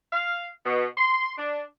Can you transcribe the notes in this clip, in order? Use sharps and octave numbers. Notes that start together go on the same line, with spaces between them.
F5
B2
C6
D4